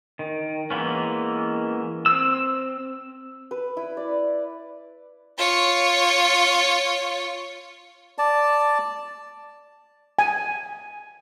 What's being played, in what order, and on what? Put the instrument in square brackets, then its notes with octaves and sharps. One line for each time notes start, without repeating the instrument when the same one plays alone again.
[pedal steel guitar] D#3
E3 G#3 A#3 B3 C#4
C4 E6
[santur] B4
E4
D5
[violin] F4 C#5
[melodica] D5 A5
[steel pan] G#5